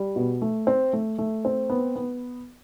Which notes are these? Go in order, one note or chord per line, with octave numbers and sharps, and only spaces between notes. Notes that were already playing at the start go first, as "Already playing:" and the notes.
Already playing: G3
B2
A3
C4
A3
A3
C4
B3
B3